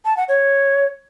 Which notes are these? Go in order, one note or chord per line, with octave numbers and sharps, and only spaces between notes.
A5
F#5
C#5